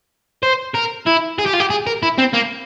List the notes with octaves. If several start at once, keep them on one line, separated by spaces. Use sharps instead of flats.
C5
A#4
E4
G#4
G4
F4
G4
G#4
A#4
E4
C4
A#3